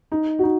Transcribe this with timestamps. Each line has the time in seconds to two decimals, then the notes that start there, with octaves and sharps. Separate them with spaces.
0.12 D#4
0.39 F#4
0.43 D#4